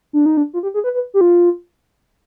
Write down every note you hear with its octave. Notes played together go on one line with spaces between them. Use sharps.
D4
D#4
D4
F4
G4
G#4
B4
B4
G4
F4